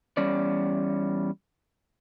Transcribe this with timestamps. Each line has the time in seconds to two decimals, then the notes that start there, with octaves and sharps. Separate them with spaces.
0.17 E2 G3 C#4 D5